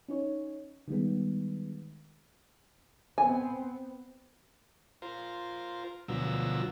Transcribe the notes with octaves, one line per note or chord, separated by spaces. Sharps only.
C#4 D#4 C#5
D#3 G3 G#3 B3
B3 C4 G#5
F4 A#4 C5
D2 B2 F3 F#3 A#4 E6